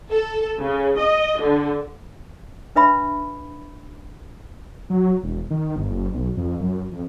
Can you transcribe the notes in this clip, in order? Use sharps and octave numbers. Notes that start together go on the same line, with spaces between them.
A4
C#3
D#5
D3
D4 B4 E5 B5
F#3
E1
D#3
G1
F#1
B1
F2
F#2
F2